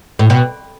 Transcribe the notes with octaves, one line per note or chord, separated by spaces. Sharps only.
A2
B2